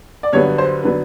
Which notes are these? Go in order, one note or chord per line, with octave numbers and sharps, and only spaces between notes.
D5
G2 D3 F#3 B3 C#5
C5
D3 F#3 B3 B4